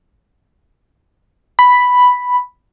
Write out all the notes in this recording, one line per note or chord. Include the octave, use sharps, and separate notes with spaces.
B5